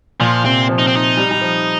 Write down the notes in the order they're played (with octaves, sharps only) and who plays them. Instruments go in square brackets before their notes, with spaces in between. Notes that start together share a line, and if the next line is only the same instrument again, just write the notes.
[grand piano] A#2 [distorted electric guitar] F3
[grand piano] C3 [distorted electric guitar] C4
[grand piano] F3
[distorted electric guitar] D#4
C4
D#4
[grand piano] G3
G3
F3